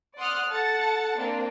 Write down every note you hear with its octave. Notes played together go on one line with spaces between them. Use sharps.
D5 F#5 C6 D#6 F6 F#6
A4 F#5 A5 A6 C#7
A#3 C4 D4